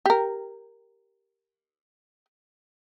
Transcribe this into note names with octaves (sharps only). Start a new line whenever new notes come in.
G4 A#4